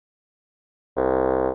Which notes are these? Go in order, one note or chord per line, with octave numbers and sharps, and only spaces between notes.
C2